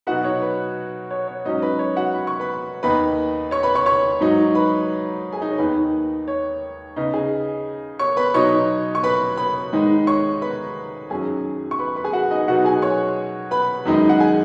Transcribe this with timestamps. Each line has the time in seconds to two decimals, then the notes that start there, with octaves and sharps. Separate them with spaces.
0.07 B2 F#3 B3 D#4 F#4 F#5
0.24 C#5
0.42 B4
1.11 C#5
1.28 C#5
1.45 G#2 F#3 C#4 D#4 D#5
1.62 B4
1.79 C#5
1.96 F#4 F#5
2.13 B5
2.27 C#6
2.40 B4 B5
2.83 D#2 D#3 B3 D#4 B4 B5
3.51 C#5 C#6
3.63 B4 B5
3.75 C#5 C#6
3.86 C#5 C#6
4.21 G#2 F#3 D#4
4.55 B4 B5
5.32 G#4 G#5
5.41 D#4 D#5
5.50 C#5
5.58 D#2 D#3 B3 D#4 B4
6.28 C#5
6.96 C#3 B3 D#4 D#5
7.14 G#4 G#5
7.99 C#5 C#6
8.17 B4 B5
8.34 B2 F#3 D#4 C#5 C#6
8.95 C#6
9.04 B4 B5
9.37 B4 B5
9.73 G#2 D#3 G#3 D#4
10.07 C#5 C#6
10.42 B4 B5
11.10 F#2 D#3 F#3 C#4 G#4 G#5
11.71 C#6
11.79 B4 B5
11.96 B4 B5
12.04 G#4 G#5
12.13 F#4 F#5
12.31 D#4 D#5
12.48 B2 F#3 B3 D#4 F#4 F#5
12.65 G#4 G#5
12.82 C#5 C#6
13.51 B4 B5
13.85 F#2 D#3 G#3 D#4
14.09 F#5
14.20 G#4 G#5